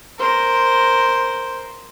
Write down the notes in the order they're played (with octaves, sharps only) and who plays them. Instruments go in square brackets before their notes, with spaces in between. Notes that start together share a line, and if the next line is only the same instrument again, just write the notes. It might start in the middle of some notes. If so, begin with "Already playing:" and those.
[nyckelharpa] A#4 C5